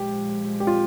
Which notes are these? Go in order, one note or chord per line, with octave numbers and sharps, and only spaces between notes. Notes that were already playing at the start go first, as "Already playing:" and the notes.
Already playing: A#2 F3 G#3 G4
G4
F4